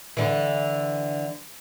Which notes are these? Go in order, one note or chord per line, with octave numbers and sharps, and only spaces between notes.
D3 E3